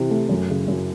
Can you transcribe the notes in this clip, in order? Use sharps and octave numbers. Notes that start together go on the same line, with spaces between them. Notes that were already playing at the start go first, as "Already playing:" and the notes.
Already playing: C3 E3
A3
F#2
C#3
F#2